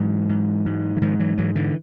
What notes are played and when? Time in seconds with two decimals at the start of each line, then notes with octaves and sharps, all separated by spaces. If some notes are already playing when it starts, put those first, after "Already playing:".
Already playing: G#2 E3 F#3
0.29 G#2
0.66 G#2
0.97 E3
1.01 G#2 D#3 F3
1.19 E3 F#3
1.38 G#2 E3 F#3
1.55 D3 E3